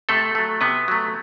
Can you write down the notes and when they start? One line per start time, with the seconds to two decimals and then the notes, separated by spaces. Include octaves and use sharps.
0.09 C3 A3 A4
0.35 F#3 A3
0.61 C3 B3 B4
0.88 F#3 A3